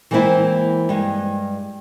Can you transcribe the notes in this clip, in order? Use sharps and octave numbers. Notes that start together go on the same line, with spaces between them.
E3 G#3 A#3 C4 E4
G2 G#3